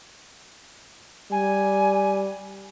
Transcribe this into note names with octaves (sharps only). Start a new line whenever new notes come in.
G3 G#5